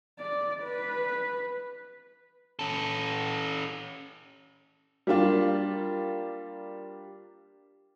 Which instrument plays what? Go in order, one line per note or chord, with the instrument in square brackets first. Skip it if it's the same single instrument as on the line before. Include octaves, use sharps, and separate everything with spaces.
[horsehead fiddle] D5
B4
[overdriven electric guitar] C#4 A4
[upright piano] G3 A#3 D4 F4